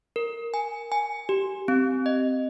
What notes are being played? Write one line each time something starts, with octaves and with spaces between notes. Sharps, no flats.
A#4
G#5
G#5
G4
C4
D#5